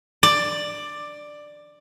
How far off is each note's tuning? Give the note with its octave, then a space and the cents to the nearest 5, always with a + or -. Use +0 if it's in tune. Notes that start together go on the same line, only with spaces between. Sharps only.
D5 +10